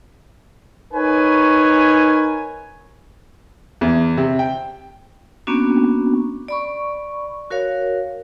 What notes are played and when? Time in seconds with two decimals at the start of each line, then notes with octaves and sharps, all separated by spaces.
0.94 D#4 A#4 B4 C#5 G#5
3.81 E2
4.17 C3
4.39 G5
5.47 A#3 B3 C#4 D4 F#4
6.48 D5 B5 C#6
7.51 F#4 A#4 C#5 F5